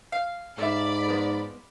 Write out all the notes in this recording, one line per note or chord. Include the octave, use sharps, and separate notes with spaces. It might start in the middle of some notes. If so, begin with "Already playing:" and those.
F5
G#2 A4 D5 E5 B5
F3 G#3 B3